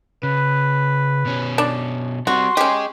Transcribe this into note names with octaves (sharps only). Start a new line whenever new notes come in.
C#3 B4
B2 C#4
D4
G3 C4 F#4 C6
C#4 G4 G#4 D#5